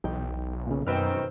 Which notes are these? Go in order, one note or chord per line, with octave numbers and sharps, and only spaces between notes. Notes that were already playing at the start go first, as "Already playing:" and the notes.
B1 E2 D#4 G5
A#2 C#3
F#2 B2 D#3 C4 B4 F6